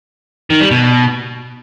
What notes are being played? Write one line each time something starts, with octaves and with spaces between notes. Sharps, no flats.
D#3
G3
B2